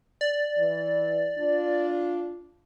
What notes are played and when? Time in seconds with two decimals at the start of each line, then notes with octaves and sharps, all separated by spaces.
0.21 D5
0.58 E3
1.38 D4 F4